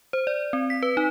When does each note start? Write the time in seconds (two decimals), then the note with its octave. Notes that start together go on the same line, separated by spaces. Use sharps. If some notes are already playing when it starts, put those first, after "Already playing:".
0.13 C5
0.27 D5
0.53 C4
0.70 B6
0.83 B4
0.97 D#4